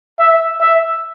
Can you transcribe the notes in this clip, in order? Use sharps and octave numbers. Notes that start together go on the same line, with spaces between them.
E5
E5